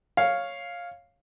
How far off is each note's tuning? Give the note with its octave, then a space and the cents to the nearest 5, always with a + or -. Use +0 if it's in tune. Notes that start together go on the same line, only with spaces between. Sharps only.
C#5 +0 F5 +0